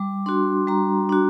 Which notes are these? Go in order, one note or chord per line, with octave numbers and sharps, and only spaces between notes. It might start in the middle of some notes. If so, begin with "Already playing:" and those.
Already playing: G3 D6
D4 F#4 C6
G3 A#5
D4 F#4